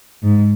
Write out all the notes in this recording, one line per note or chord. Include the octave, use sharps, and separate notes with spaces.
G#2